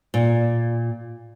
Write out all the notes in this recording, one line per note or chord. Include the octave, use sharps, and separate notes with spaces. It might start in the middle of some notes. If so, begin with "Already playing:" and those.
A#2